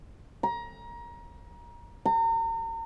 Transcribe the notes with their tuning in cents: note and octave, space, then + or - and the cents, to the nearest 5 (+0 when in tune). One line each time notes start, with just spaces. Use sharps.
A#5 +25
A#5 -35